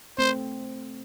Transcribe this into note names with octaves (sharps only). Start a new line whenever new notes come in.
A3 C4 C5